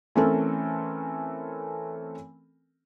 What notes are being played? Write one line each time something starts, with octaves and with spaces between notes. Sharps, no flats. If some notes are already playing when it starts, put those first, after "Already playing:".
E3 A3 C4 C#4 A4 A#4